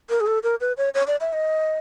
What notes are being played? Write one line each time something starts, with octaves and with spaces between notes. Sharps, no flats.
A#4
G#4
A4
A#4
B4
C#5
C#5
D5
E5
D#5